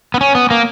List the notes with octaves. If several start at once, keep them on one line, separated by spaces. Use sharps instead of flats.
B3
C#4
B3
A#3